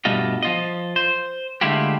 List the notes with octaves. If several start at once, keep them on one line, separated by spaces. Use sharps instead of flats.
G2 B2 G3 A3 F4 D#5
F3 F4 D#5
C5
D3 G#3 A3 E4 F4 G4